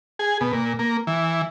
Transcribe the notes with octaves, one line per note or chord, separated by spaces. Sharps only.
G#4
B2
A#2
A#3
E3